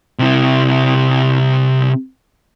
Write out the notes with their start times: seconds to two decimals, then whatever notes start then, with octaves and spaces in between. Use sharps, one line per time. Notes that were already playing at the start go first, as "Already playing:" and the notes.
0.19 C3 E4